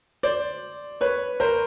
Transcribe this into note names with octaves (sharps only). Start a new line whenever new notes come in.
C5 D5
B4 C#5
A#4 C5